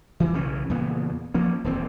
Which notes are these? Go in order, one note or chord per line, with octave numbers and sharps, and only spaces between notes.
E3
B1 C#3 E3 C#4
E2 A#2 C#3 B3
F3 A#3 C#4
D#1 E2 C4